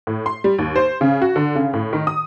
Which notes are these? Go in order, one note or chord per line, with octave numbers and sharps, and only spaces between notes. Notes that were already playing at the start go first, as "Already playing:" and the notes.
A2
C6
G3
D#2
C5
C#3
F#4
D3
C#3
A2
D#3
D#6